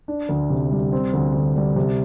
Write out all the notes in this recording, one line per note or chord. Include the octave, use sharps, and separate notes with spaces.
D4
D2
C3
G3
C4
D2
D3
G3
C3